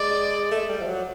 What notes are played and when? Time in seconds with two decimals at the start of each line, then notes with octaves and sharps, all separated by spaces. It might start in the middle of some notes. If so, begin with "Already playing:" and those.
Already playing: G#3 D5
0.51 A3
0.69 G3
0.81 F3
0.87 F#3